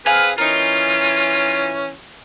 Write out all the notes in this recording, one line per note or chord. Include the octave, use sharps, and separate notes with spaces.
C4 G#4 B4 F5 G#5
E3 C#4 D#4 F4 A#4